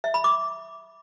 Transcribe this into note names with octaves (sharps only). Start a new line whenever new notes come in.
E5
B5
D6